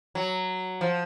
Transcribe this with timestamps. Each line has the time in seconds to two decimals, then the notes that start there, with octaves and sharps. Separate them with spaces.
0.15 F#3
0.81 F3